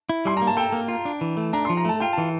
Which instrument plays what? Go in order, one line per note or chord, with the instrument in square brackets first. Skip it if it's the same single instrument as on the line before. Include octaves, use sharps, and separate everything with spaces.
[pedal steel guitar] E4
[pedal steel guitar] G3 [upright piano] C6
[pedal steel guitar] A#3 [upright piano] A#5
[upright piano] A5
[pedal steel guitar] A4 [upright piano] G5
[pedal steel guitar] A#3
F4
D4
E3
A3
[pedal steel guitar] D4 [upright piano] A#5
[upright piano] C6
[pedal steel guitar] F3
[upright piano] A#5
[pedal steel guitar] A3 [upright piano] A5
[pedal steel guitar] F4 [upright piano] G5
[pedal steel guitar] E3 [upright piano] A5